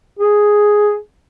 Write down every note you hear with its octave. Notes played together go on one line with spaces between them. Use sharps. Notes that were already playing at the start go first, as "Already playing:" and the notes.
G#4